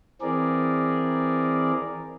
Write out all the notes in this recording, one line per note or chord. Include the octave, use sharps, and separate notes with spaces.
E3 C4 G#4 A#4 D5